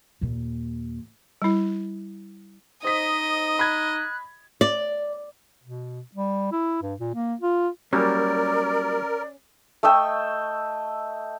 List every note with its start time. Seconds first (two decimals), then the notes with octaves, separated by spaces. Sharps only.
0.21 D#2 A#2
1.42 G3 E4
2.84 D#4 C5 D#5 D#6 B6
3.59 B5 F#6 G#6
4.61 D5
5.63 B2
6.15 G3
6.52 E4
6.82 G2
6.99 A#2
7.15 A#3
7.41 F4
7.93 F#3 G3 A#3 C#4 A#4 D5
9.83 A3 D#5 E5 G5